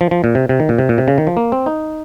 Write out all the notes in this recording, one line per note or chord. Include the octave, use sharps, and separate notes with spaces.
F3
F3
A#2
C3
C3
D#3
A#2
C3
A#2
C3
C#3
D#3
F3
A#3
C4
D#4